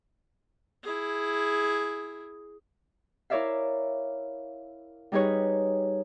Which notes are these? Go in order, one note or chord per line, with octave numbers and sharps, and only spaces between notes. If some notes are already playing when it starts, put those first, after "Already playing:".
E4 G#4
E4 A#4 C#5 D5 E5 F5
G3 D#4 G#4 B4 C#5